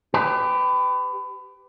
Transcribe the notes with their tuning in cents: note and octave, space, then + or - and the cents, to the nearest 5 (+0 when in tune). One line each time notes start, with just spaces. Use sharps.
G4 +0 B4 +30